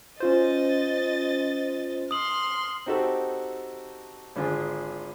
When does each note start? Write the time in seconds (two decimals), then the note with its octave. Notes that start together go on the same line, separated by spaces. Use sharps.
0.20 C#4 F4 C5 D#5 A6
2.11 C6 D#6 F6 F#7
2.86 C4 D#4 F#4 G4 A4
4.36 G#1 D3 F4 G#4